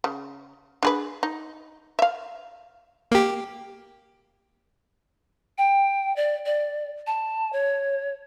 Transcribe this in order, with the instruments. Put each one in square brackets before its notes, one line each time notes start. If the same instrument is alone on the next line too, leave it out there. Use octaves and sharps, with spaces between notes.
[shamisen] C#3
D4 G#4 B4
D#4
E5 F5
[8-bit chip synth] A#3 G4
[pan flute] G5
D5
D5
A5
C#5